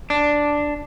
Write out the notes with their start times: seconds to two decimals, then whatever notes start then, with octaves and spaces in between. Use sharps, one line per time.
0.10 D4